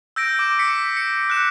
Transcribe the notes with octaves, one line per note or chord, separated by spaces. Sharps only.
E6 G6 A#6 D7
D6 D7
B6 C#7
C#7
F#6 E7